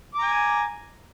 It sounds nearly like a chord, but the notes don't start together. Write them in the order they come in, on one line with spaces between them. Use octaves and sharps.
D6 A#5 G#5